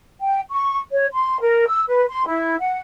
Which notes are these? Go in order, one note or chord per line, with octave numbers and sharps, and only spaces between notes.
G5
C#6
C#5
C6
A#4
E6
B4
C6
E4
F#5